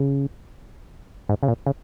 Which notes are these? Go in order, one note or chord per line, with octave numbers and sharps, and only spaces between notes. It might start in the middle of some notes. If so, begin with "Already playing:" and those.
Already playing: C#3
G#2
C#3
A#2
C#3